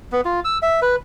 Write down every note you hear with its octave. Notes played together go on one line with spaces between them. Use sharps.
B3
F4
E6
E5
B4